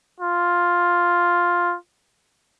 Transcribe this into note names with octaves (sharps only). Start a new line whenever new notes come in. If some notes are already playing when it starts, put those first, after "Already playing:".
F4